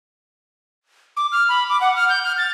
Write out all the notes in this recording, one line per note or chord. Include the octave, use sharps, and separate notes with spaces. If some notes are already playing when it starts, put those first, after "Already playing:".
D6
F6
B5
D6
F#5
F6
G6
F6
A6